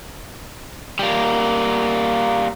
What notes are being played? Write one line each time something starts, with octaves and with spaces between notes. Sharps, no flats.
G3 A#3